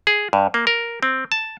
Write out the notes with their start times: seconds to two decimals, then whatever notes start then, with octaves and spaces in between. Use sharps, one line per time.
0.07 G#4
0.33 G2
0.54 A#3
0.67 A#4
1.03 C4
1.32 A5